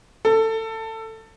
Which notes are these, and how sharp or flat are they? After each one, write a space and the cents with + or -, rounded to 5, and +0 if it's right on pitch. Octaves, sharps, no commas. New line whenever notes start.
A4 +20